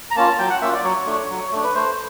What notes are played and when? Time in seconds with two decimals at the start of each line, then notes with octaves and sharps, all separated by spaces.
0.11 A#5
0.16 A#3 C#4 F4 A5
0.39 F#3 G5
0.50 F#5
0.61 A#3 C#4 F4 E5
0.73 D5
0.84 F#3 C#5
1.06 A3 D4
1.30 F#3
1.52 A3 D4
1.63 B4
1.75 A3 C5